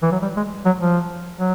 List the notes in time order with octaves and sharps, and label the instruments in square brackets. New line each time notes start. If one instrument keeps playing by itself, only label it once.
[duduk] E3
F#3
G3
G#3
F#3
F3
F#3